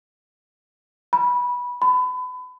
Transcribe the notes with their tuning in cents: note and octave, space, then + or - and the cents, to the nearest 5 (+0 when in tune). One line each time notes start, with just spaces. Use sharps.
B5 -15
B5 +30